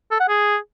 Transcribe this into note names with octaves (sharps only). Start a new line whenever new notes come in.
A4
F#5
G#4